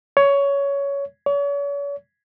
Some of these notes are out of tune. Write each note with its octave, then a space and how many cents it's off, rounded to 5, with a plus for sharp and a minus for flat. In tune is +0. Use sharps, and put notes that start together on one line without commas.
C#5 +15
C#5 +40